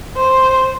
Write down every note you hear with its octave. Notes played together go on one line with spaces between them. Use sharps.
C5